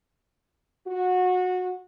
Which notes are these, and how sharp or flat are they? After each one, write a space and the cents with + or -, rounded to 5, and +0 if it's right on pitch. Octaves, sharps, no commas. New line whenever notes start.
F#4 -20